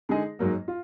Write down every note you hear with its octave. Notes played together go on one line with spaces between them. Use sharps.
D3 G#3 D#4 G#4 D#5
G#2 F#3 A#3
F4